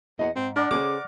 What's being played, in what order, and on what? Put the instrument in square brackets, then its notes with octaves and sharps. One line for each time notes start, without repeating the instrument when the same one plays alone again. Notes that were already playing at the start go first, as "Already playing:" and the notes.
[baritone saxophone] E2 [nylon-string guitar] D#5 F5 F#5
[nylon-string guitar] G#2 [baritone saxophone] C4
[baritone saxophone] D4 [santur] A#4 D5 F#5
[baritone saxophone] C#3 [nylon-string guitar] G#4 A4 C5 [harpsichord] D6